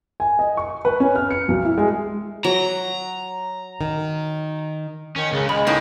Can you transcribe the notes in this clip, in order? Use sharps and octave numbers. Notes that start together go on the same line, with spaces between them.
G#5
D#5
C#6
B4
C#4
F6
C#7
B1
E4
G#3
F#3 A#5
D#3
D#3 C#4
C#2 C#3
G#3 B5
A2 A#3 C#4 D#4